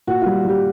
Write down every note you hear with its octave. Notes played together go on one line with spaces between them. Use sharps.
A#2 F#4
G3 F4
G3 G4